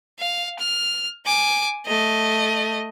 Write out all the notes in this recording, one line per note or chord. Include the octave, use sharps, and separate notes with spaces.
F5
F6
G#5 D6
A3 D#5